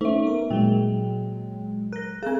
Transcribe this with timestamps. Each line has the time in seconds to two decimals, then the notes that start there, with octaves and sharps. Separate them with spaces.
0.01 A3 C#4 D#4 E5
0.24 B3 A#4
0.50 A#2 F#3 G#3 G5
1.93 A#4 F#6 A#6
2.23 C4 G#4 A#4 E5 G#5